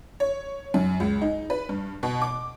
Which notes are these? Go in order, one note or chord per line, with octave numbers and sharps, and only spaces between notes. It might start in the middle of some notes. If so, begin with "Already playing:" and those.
C#5
F#2
C#2
D#4
B4
G2
B2
D6